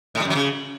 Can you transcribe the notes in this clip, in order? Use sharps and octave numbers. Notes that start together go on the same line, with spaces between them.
A2
G3
F#2
F#3
C#3